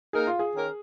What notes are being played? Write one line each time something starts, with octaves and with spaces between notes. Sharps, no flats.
A#3 D#4 G#4 A#4
F4
G#4
D#3 C#4 A#4